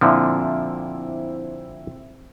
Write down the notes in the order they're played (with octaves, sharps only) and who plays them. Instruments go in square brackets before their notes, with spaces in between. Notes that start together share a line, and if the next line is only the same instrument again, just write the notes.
[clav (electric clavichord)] A#2 D3 F3 [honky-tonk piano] C4 E4